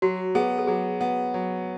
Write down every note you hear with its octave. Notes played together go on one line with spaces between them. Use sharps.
F#3 F#4
B3 G#4
A4
F#3 G#4
B3
F#3